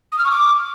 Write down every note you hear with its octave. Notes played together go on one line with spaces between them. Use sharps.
D#6
F6
C#6
D6